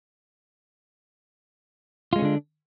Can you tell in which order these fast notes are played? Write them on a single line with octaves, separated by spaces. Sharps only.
F4 G#3 C#4 D3 D4